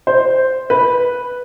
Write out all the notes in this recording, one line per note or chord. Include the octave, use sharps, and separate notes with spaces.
C5
B4